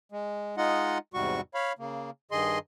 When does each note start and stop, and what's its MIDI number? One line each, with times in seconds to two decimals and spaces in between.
0.12 0.56 56
0.57 0.98 56
0.57 0.98 63
0.57 0.98 65
0.57 0.98 75
0.57 0.98 78
1.14 1.41 40
1.14 1.41 44
1.14 1.41 48
1.14 1.41 55
1.14 1.41 66
1.14 1.41 85
1.54 1.72 73
1.54 1.72 77
1.54 1.72 83
1.79 2.10 49
1.79 2.10 58
2.31 2.59 43
2.31 2.59 51
2.31 2.59 68
2.31 2.59 75
2.31 2.59 84